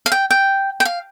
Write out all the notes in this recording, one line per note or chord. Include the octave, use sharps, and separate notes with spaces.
F5
G5
G5
G5
F5